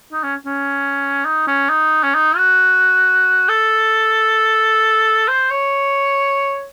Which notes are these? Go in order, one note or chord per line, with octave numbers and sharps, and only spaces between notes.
D#4
C#4
C#4
D#4
C#4
D#4
C#4
D#4
F#4
A4
C5
C#5